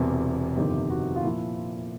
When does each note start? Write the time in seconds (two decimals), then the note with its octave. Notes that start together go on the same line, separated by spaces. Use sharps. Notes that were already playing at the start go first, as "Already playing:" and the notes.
Already playing: E1 E2 C3
0.56 G1 F2 C3 D#3 G4
0.90 F#4
1.16 F4
1.24 A#2 F3 E4